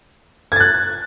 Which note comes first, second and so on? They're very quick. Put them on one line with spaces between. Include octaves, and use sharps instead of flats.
G#6 A6 F#6